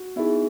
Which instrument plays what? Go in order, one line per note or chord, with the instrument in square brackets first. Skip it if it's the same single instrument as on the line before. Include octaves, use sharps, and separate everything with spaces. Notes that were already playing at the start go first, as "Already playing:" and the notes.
Already playing: [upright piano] F#4
[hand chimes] B3 D#4 G#4 [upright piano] E4